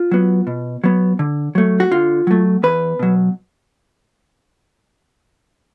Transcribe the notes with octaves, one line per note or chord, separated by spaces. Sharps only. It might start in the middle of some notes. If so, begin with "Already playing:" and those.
Already playing: F4
F#3 B3
B2
F#3 B3
D3
F#3 A3
F#4
D3 F4
F#3 A3
E2 B4
B2 F#3